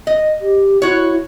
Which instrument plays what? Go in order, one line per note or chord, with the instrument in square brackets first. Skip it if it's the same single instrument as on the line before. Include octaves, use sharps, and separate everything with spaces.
[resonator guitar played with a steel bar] D#5
[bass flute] G4
[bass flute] E4 [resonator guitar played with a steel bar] F#4 C#5